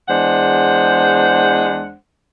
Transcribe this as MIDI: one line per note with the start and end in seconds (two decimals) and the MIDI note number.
0.09 1.94 40
0.09 1.94 56
0.09 1.94 62
0.09 1.94 72
0.09 1.94 78